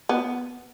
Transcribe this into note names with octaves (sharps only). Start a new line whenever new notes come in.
B3